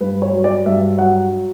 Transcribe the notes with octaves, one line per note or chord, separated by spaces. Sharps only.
G2 B4
C#5
F#3
D5
G2 E5
F#3 F#5